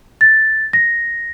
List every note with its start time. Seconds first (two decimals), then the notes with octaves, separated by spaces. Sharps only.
0.21 A6
0.73 A#6